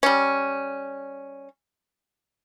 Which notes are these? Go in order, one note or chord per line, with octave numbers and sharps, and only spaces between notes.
G3 C#4